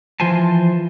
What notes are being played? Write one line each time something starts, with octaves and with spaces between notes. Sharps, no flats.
E3 F3 F4 C5 G#5 A5